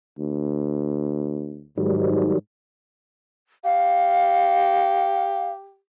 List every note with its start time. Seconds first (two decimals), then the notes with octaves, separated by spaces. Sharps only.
0.18 D2
1.78 G#2 D#3 F#3 G3
3.65 G4 F5